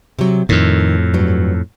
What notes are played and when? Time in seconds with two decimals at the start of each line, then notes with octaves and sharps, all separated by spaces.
0.19 C3 F#3
0.49 F2 A2 D#3
1.14 G2 F#3